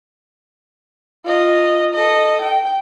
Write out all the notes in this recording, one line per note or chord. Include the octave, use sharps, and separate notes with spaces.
F4 D#5
A4 D#5
G5